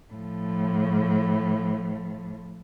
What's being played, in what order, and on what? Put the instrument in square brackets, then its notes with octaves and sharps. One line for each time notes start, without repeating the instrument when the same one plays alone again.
[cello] A2 F3